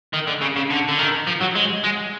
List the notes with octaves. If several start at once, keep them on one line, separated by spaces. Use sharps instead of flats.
D#3
D3
C#3
C#3
D3
D3
D#3
F3
F#3
G#3
G#3